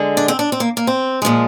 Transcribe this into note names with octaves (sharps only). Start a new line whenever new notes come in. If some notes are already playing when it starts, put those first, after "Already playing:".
Already playing: D3 G#3
D4
C4
D4
C4
A#3
A#3
C4
A#2 F3 G#3